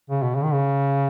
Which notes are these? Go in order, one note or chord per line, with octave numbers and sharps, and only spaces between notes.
C#3
B2
C#3
D#3
C#3